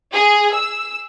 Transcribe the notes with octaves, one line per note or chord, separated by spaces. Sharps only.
G#4
E6